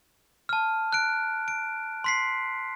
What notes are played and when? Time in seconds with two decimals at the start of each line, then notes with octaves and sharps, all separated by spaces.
0.49 A5 F6
0.92 F#6 D7
1.48 D7
2.04 C6 B6 C7